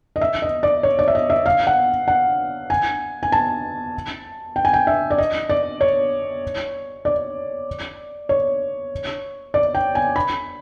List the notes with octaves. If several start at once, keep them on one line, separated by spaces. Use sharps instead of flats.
D#5
E5
D#5
D5
C#5
D5
E5
D#5
E5
F5
F#5
F#5
G#5
G#5
A5
G5
G#5
G5
E5
D5
D#5
D5
C#5
D5
C#5
D5
G5
G#5
B5